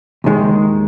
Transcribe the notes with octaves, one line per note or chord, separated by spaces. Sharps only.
D#2 D#3 G#3